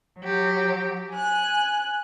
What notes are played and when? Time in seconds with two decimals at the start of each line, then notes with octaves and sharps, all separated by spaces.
0.19 F#3 G4
1.09 G#5 F#6